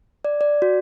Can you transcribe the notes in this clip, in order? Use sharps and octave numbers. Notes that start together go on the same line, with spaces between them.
D5
D5
F#4